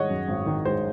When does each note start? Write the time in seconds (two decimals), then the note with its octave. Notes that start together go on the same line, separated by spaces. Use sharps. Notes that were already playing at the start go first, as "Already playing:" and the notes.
Already playing: G#1 D#3 G#3 C#5 D#5 F#5
0.10 F#2
0.28 G#1
0.46 D#3
0.65 G#3 C5